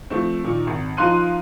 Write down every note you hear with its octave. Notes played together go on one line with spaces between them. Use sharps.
F3 A3 C4
A#2 D#3
G#1
F3 D#4 F5 C6 F#6 D#7